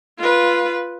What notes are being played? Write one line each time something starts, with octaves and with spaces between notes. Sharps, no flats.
F4 B4